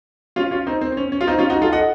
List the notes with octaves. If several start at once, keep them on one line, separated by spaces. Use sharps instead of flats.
C#4 F4
C#4 F4
C4 D#4
C4
C4
C#4
C#4
F4
C4 D#4
C#4 F4
D#4 F#4
F4 A4
D#5 F#5